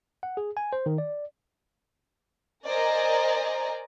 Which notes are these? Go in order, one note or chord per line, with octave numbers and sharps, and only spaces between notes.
F#5
G#4
G#5
C5
D#3
D5
A#4 C5 D5 D#5 G#5 A#5